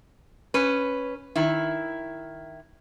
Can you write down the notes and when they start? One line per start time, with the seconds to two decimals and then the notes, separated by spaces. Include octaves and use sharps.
0.54 C#4 B4
1.36 D#3 E4